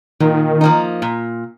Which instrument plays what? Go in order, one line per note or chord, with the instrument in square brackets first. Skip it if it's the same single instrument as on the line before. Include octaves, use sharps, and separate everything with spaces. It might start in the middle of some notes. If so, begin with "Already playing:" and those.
[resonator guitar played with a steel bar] A#2 [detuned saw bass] D#3
[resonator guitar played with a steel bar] F3 A#3 D#4
A#2